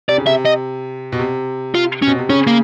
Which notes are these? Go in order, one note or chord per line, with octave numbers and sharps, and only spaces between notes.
C3 D5
C#3
C3 E5
D#5
B2
C3
F4
C#4
B2
C3
C#3 C#4
A#3